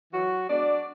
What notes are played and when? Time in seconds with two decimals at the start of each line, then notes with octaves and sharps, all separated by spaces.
0.13 E3 F#3 F#4
0.48 G#3 B3 D4 D5